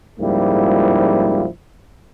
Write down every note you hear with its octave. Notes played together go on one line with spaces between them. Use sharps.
C#2 G#2 F3 G3 A#3 E4